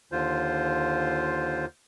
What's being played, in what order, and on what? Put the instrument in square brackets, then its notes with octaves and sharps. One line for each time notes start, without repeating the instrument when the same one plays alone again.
[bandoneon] D#2 D3 F4 C5